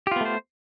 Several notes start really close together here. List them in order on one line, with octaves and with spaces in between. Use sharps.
G4 F4 B3 A3 C5